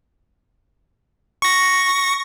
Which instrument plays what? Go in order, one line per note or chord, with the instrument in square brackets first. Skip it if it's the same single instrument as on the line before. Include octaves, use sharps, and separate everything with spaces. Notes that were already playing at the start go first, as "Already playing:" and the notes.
[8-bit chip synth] C#6 A#6